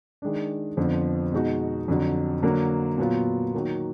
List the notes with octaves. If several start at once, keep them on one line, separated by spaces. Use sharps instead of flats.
D#3 G#3 D4
F2 D3 F3 B3
B2 G#3 D#4 F#4
F2 D3 F#3
D3 F#3 A#3
A#2 F#3 B3 F4
D#3 F#3 A#3